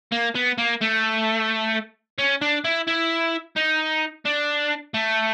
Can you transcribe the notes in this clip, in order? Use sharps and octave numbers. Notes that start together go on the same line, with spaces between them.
A#3
B3
A#3
A3
C#4
D4
E4
E4
D#4
D4
A3